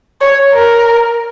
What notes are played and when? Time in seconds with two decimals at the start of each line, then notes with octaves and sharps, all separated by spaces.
0.21 C#5
0.53 A#4